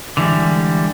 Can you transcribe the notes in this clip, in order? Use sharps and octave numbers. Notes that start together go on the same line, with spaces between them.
D3 E3 G3 G#3